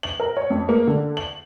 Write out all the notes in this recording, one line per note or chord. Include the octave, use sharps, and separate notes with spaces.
F#7
A#4
C#5
F2
A#3
D3
F#7